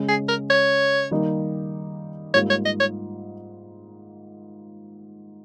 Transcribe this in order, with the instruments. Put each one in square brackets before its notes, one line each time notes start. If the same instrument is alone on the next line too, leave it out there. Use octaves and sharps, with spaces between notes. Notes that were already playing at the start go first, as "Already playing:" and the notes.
Already playing: [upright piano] C#3 G#3 C#4
[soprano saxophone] G#4
A#4
C#5
[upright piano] D#3 G3 A#3 D#4 G4
[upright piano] G#2 G3 A#3 F4 [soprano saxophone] C#5
[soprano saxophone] C#5
D#5
C#5